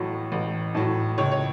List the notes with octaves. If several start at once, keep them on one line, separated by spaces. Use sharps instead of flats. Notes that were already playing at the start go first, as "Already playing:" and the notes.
Already playing: A1 A2 F#3
A1
A2 F#3
C#2 C#5
C#5